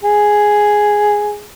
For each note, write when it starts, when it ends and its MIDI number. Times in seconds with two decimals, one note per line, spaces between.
0.03 1.45 68